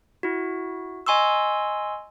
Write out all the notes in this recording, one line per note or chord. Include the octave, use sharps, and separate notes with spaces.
E4 F#4
D#5 G#5 C6 C#6 E6